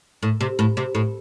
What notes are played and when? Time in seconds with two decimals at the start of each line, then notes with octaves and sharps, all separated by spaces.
0.23 A2
0.41 C3
0.59 A2
0.77 C3
0.95 A2